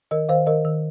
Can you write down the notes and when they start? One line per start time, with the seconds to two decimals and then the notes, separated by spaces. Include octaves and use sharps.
0.11 D#3 A#4 D#5
0.29 D#3 C5 F5
0.46 D#3 A#4 D#5
0.65 D#3